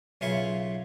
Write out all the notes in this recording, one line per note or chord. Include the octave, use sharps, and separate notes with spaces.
B1 C#3 F4 E5 G#5 C#6